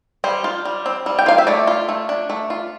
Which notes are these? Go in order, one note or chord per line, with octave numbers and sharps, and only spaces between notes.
G3 C5
F4
G3
C4
G3
G5
F4 F5
E5
A3 D5
F4
A3
D4
A3
F4